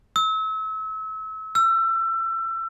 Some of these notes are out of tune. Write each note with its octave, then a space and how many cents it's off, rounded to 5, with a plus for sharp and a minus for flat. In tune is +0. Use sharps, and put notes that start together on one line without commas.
E6 -35
E6 +30